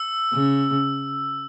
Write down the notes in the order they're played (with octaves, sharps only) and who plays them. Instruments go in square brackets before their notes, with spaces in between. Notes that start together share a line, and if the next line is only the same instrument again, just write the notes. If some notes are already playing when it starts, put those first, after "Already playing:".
Already playing: [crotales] E6
[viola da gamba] C#3